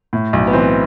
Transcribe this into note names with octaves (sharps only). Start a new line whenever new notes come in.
A2
B1
B3
E3 C4